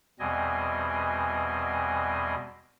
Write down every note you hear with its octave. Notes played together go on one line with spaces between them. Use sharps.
E2 B2 G3 C4 D#5 G#5